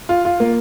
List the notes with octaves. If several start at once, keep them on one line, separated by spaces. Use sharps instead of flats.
F4
F4
A#3